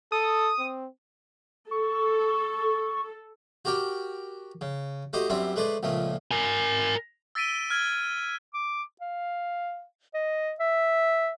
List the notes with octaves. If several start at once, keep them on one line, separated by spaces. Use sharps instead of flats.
A4 D#6
C4
A4 C#6
F#4 G4 A#4 D5 G5
C#3
A3 F#4 G4 C5 D#5
F#2 G3 C4 D4 E5 C6
G#3 A3 B4 C5 D5
C#2 A#2 F3 A3
A#4 G#5
E6 A6 B6 D7 D#7 G7
F6 G#6
D6
F5
D#5
E5